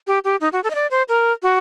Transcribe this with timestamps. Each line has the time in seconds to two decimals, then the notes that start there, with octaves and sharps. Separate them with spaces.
0.07 G4
0.24 G4
0.41 D#4
0.53 F#4
0.64 A4
0.70 D#5
0.75 D5
0.91 C5
1.09 A#4
1.43 F#4